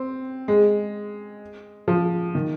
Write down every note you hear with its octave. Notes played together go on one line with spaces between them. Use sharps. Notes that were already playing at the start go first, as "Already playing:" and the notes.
Already playing: C4
G#3
F3
D#3